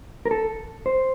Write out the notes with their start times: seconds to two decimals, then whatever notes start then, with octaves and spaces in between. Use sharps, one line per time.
0.26 A#4
0.31 A4
0.86 C5